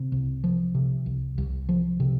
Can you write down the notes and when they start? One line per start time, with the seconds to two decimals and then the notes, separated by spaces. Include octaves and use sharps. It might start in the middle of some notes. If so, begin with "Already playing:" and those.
Already playing: C3
0.12 C2
0.44 F3
0.75 C3
1.06 C2
1.38 C2
1.69 F3
2.00 C3